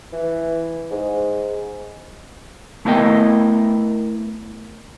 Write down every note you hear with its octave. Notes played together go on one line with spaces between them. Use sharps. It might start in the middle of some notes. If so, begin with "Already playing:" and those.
E3
G#2
A3 B3 E4 A#4 D#5 G5